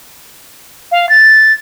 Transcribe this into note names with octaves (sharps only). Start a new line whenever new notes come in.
F5
A6